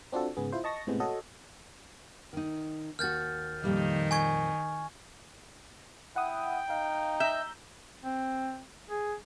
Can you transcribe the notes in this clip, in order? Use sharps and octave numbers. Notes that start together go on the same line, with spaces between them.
C4 D4 F4 F#4 A4
G#2 C#3 B3 G#4
E4 F4 C5
D#5 A5 C#6 A#6
A2 C3 G#3 B3
F#4 A4 C#5 D#5
D#3 D#4
D#2 F#4 F6 G6 A6
F2 A#2 D#3 G3
G#5 C#6 G#6
E4 F#5 G5 D#6
D#4 F5
E5 A#5 E6 G6
C4
G#4